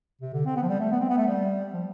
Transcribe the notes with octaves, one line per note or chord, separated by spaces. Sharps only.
C3
D3
C4
B3
F3
G3
A3
B3
C4
B3
A3
G3
F3